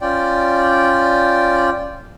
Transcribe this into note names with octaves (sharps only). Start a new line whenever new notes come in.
C#4 F4 D5 G5